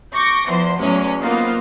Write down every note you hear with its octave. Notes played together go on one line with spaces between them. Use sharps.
C#6 D6 G6 A#6
E2 F3 C5 C6
E2 A2 F#3 G#3 C#4
A#3 B3 D#4 F4 C5 F5